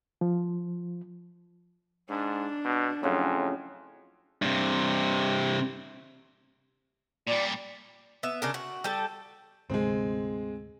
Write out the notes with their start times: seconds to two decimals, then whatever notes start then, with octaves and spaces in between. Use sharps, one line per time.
0.21 F3
2.09 G#2 D4
2.65 B2
3.03 F2 A2 C#3 F#3
4.42 G2 C3
7.27 A#2 G3 D5
8.23 B3 E5
8.42 C#3 D4 A#4
8.54 F#4
8.84 G3 A4
9.70 D2 G#2 C3 G#3 C4